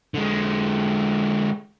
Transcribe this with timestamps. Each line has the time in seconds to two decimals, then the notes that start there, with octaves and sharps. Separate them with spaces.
0.14 D3 G#3